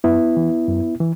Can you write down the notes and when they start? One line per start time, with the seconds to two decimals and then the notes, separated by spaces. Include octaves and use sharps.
0.04 F#2 B3 E4
0.37 E3
0.68 F#2
1.00 E3